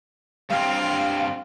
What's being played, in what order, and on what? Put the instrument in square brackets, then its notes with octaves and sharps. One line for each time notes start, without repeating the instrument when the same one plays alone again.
[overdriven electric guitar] G2 C4 [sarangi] F5